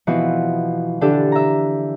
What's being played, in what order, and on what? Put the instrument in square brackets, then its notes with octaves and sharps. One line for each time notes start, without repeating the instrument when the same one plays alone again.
[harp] B2 E3 F3 C4 F#4
D3 E3 D4 G4 A4
E5 A#5